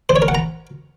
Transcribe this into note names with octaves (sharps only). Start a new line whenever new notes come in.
C5
C#5
A#4
F#5
A#5